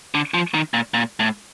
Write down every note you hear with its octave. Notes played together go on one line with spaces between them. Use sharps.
D3
F3
D#3
A#2
A#2
A2